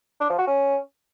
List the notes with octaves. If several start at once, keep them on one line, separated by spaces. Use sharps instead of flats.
D4
F3
F#4
C#4